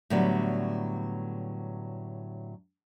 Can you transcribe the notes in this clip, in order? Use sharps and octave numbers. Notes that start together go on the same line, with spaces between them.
A2 D3 F#3 G3 B3